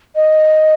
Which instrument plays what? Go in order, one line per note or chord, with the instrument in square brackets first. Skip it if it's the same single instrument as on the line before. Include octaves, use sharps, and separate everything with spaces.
[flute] D#5